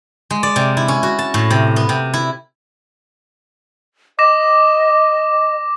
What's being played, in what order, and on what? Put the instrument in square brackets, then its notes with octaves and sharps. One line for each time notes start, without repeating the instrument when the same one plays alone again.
[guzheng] G#3
D5
C3
E4
C#4
F#4
A5
A2
C3
B3
C3
E4
[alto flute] D#5 [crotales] D6 A#6 E7